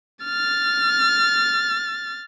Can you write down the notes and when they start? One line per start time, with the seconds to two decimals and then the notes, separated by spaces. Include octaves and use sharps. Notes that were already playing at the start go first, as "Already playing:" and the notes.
0.25 F6 A6